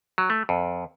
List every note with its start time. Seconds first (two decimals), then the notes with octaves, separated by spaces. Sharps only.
0.18 F#3
0.30 A3
0.49 F2